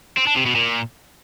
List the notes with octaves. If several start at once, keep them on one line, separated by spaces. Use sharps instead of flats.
C4
D4
C3
B2
A#2